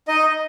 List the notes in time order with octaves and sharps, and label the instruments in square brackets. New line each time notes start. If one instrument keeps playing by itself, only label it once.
[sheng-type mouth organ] D#4 D#5